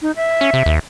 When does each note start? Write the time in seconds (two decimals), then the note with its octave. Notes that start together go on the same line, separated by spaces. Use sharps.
0.02 D#4
0.16 E5
0.41 C#4
0.53 C3
0.66 D#2